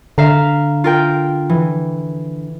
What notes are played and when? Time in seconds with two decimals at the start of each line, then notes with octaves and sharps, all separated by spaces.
0.18 D3 E5 F5 A#5
0.84 F4 A#4 G5
1.49 E3